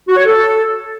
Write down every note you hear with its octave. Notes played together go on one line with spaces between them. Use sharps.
F#4
C#5
A4